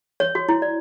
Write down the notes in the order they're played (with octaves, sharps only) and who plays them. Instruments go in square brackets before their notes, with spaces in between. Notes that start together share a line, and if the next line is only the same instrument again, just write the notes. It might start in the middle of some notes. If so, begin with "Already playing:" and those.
[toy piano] C#5
F#4
E4
D5